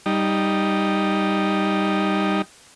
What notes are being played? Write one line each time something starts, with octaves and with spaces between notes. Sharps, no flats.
G3 D#4